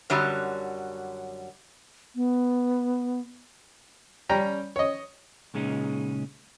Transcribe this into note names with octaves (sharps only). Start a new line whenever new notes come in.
F#2 D3 F#3 G3
B3
G3 C#4 G5 A#5
C#5 D#5
A#2 C#3 G#3 C#4 D#4